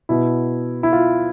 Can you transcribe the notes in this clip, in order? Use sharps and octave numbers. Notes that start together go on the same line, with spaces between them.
B2 E4
E4
F4